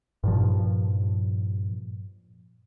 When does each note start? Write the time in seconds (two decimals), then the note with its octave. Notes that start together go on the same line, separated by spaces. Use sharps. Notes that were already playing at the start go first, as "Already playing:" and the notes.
0.24 G2 A#2 F3